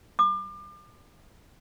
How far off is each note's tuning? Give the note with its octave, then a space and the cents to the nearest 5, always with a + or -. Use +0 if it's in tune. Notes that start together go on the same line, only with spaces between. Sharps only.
D6 +35